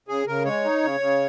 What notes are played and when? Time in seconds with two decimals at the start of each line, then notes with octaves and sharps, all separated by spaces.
0.08 C#3 G#4
0.27 C#3 A#4
0.45 G#3 C#5
0.64 D#4
0.83 C#3
1.00 C#3